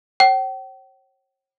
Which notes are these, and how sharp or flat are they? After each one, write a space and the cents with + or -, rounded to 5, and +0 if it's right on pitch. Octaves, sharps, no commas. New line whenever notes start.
C#5 -40 G5 -40